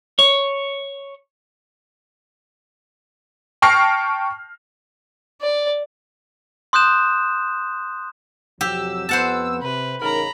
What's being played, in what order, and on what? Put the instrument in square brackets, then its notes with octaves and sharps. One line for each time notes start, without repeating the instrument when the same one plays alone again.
[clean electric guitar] C#5
[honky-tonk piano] G5 A5 C#6 F6 A#6 C7
[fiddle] D5
[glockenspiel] C6 D#6 F#6 G6 E7
[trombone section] F2 C3 F#3 [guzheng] G4 [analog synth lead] E6
[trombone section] F2 B3 [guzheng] C5 F#5 A5
[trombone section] C3 [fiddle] B4
[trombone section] A1 C#3 D#4 [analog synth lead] A#4 [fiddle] A#5 B5